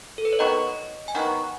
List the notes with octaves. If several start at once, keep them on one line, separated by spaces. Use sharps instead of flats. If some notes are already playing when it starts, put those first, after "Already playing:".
A4
B4
C#5
D#3 F#3 B3 F#4 D#5
G#5
D#3 F#3 B3 F#4 F#5